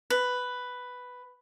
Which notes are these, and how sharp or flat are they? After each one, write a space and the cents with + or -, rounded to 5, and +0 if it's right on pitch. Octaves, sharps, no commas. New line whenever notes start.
B4 +5